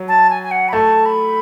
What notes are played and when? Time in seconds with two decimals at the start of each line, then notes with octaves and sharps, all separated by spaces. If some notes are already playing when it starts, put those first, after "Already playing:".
Already playing: F#3
0.08 A5
0.30 G#5
0.43 G#5
0.51 F#5
0.69 B5
0.73 A3 A5
1.06 B5